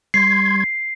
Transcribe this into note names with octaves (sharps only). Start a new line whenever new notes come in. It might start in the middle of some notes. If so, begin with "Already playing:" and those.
G3 C6 G#6 C7